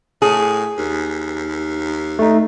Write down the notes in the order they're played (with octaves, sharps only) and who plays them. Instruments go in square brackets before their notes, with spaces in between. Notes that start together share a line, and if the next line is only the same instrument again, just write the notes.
[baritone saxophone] A2 [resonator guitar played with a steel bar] G#4
[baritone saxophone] D#2
[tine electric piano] A3 D#4